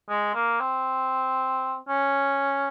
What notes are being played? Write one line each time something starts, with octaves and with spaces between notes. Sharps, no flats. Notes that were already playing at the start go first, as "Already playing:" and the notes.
G#3
A#3
C4
C#4